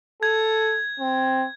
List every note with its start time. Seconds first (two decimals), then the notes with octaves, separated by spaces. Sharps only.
0.23 A4 G#6
1.00 C4